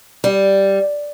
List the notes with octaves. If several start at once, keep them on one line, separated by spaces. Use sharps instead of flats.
G3